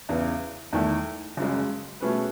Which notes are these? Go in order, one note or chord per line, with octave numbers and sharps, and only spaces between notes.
E2 C#3 E3 B3
E2 D#3 A3 E4 A4
F#1 F#2 C#3 G#3
B2 A3 C#4 G#4 B4